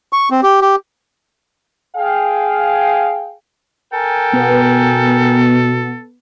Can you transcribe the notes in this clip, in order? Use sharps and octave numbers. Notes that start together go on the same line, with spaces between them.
C#6
C4
G4
G4
G#4 F5 G5
A4 A#4 G5 G#5
B2 B3